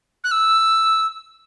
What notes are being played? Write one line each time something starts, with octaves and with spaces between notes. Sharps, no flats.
F#6
E6